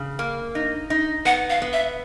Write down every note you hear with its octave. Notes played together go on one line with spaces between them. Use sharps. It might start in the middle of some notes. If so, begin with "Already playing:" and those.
Already playing: C#3
A#3
D#4
D#4
B3 F#5
F5
B3
E5